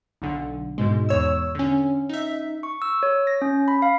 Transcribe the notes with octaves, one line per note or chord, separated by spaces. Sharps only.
B1 D3
G#2 B2 G#3
E2 C#5 E6
D3 C#4
D#4 E5
C#6
E6
C#5
A#6
C#4
B5
F5